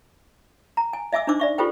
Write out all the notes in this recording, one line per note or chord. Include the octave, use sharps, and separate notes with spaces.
A#5
G#5
D#5 E5 G#5 D6 E6
D4 D#4 C5 D6 E6
D5 E5 C#6
F4 G4 A4 B4 C5 G5